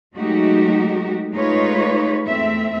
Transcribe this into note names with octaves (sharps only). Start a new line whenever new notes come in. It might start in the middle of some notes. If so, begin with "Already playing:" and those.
F#3 G#3 A3 D#4 F#4 G4
G#3 A3 D#4 F4 B4 C#5
E2 A3 C4 E5